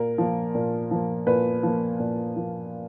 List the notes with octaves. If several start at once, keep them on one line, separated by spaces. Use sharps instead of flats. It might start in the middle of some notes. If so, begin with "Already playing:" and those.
Already playing: A#2 A#4
F3 A#3
A#2
F3 A#3
A#2 B4
F3 A#3
A#2
F3 A#3